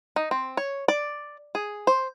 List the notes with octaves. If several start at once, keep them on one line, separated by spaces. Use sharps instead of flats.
D#4
C4
C#5
D5
G#4
C5